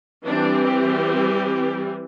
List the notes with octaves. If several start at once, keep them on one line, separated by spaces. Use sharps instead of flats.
E3 G3 C4 D4
G4